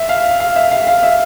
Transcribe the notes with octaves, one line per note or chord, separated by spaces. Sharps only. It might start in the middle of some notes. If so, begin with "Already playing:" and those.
Already playing: E5
F5
F5
E5
F5
F5
E5